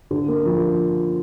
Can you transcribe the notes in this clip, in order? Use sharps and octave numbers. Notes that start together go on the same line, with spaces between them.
D3
A#3
F3